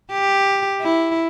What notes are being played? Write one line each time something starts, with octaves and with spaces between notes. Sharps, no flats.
G4
E4